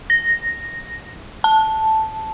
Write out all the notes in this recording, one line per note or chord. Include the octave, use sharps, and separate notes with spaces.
A#6
A5